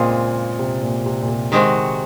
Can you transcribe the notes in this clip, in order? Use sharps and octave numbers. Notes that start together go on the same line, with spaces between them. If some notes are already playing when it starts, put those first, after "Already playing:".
Already playing: A#2 C#3 G#3 C4 F4 G#4
C3
A#2
C3
A#2
C3
C3 D#3 G#3 C4 F#4